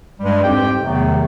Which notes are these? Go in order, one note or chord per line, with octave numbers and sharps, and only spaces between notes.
G2 G3 G#3
F2 G#2 C4 G4 G5
E2 C3 D#3 F#3 A3 B3